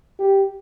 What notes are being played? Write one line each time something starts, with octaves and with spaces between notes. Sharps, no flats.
G4